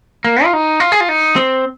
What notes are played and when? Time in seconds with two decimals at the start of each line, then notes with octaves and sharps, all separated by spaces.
0.25 A#3
0.44 F4
0.53 D#4
0.80 F4
0.92 G#4
1.00 F4
1.09 D#4
1.36 C4